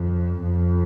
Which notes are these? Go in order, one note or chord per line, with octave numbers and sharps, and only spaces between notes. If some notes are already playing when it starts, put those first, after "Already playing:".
Already playing: F2
F2